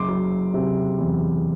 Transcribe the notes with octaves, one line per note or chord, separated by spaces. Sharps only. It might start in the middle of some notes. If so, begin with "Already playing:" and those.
Already playing: F#1 C6 D6
F#3
C3
E2